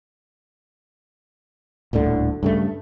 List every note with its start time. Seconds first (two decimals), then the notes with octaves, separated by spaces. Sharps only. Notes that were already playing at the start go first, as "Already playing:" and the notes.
1.93 D#1 D2 A2 D3
2.43 G2 C#3 A3